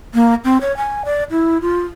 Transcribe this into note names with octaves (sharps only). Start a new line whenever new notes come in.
A#3
C4
C#5
G#5
D5
E4
F4